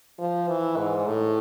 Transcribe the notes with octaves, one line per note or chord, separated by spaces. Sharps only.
F3
E3
G#2
A2